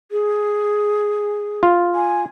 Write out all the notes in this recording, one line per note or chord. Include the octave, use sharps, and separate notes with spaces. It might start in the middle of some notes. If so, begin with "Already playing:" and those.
G#4
F4
G#5